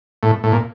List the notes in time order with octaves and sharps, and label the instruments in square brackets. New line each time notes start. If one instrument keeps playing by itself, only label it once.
[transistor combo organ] A2
A2
A#2